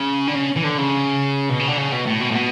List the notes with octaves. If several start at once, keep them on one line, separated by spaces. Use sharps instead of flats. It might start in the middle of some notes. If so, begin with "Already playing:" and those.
Already playing: C#3
D3
C#3
E3
D3
C#3
B2
C#3
D3
C#3
B2
A2
B2
A2
B2